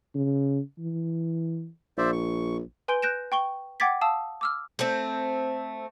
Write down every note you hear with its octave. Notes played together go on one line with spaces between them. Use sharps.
C#3
E3
A#1 C5 D5 E5
C#6
B4 G#5 C6 G6 D7 G7
F#6 G6 A#6 D7 E7
G5 C#6 G7
F#5 G5 D6 G#6 A6 B6
F5 A5 D#6 E6
D6 E6 F6
A3 C4